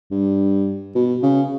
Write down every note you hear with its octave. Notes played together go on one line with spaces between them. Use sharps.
G2
B2
C#3